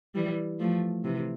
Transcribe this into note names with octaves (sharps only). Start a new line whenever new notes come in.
E3 G3
F3 A3
C3 E3